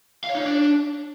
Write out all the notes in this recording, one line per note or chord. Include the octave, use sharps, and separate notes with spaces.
F5
C#5
D#4
C#5
D4